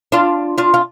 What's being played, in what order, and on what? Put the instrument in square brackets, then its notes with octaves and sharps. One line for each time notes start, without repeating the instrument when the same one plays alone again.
[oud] D4 F4
D4 F4
F4